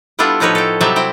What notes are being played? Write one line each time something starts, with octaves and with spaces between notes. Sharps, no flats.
G3 B3 D4 E4 F4 A4
A2 F3 D#4 B4 C#5
A4 G5
C3 F#3 G3 E5 A5
C4 E4 G5